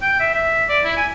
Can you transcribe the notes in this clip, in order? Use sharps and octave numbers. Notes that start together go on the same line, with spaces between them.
G5
E5
E5
D5
E4
G#5